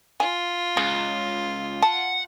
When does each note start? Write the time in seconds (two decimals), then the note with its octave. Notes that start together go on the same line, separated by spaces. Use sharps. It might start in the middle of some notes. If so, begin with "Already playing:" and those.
0.20 F4 G#5
0.77 C#2 C#3
1.82 F#5 A5